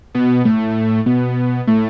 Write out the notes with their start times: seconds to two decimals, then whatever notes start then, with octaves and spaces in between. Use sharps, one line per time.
0.14 B2 B3
0.45 A2 A3
1.06 B2 B3
1.67 A2 A3